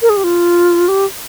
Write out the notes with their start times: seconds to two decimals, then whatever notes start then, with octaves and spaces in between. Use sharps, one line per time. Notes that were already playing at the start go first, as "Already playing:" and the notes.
0.02 A#4
0.10 G#4
0.17 G4
0.24 F4
0.88 G4